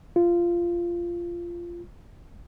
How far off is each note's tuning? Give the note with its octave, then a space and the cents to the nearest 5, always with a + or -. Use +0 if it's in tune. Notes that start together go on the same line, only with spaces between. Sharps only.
F4 -15